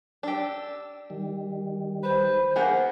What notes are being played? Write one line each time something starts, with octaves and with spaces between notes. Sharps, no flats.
D4 G4 E6
D#3 G3
B4 C5
A#3 B3 G#4 F#5